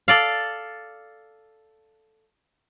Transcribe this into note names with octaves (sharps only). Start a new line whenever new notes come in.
A4 D5 F5